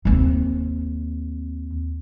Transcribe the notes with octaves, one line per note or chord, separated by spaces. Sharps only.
D#2 C4